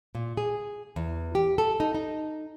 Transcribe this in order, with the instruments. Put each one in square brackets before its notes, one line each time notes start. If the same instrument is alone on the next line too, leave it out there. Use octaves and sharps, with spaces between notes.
[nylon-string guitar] A#2
G#4
E2
G4
A4
D#4
D#4